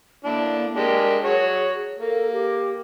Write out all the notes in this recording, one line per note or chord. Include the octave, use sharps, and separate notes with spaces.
D3 A#3 D4 E4
G#3 D4 G4 A#4
F#4 G#4 C#5
A#3 A4
G4